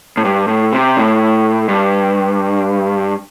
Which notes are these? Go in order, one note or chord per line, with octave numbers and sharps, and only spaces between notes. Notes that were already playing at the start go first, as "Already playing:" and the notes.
A2
G2
A2
C3
A2
G2